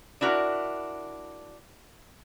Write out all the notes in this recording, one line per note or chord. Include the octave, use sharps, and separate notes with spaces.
D4 E4 F#4 A#4